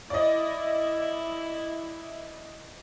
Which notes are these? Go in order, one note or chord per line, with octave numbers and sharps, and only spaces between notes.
E4 D5 D#5